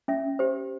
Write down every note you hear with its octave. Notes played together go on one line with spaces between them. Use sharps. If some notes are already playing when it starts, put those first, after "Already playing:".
C#4 E5
G4 C5